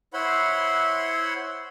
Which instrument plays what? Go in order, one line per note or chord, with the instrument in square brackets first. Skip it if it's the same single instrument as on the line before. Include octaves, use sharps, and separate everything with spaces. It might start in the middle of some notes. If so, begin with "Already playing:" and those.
[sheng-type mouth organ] E4 C5 C#5 F#5 B5 C6